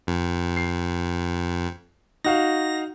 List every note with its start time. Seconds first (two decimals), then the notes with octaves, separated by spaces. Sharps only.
0.07 F2
0.57 C7
2.24 D#4 F#4 F5 A#6